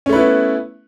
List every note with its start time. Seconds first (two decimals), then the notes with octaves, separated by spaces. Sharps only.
0.06 C#4
0.09 A3
0.13 B4
0.16 E4
0.19 B3